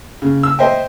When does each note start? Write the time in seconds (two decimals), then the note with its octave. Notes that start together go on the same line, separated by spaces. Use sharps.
0.22 C#3
0.43 E6
0.59 C5 D#5 E5 G5